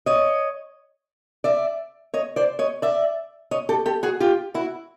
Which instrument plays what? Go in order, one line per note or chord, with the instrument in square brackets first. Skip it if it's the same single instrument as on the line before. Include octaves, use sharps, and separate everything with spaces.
[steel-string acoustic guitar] C#5 D#5
D5 E5
C#5 D#5
C5 D5
C#5 D#5
D5 E5
C#5 D#5
G4 A4
G4 A4
F#4 G#4
F4 G4
E4 F#4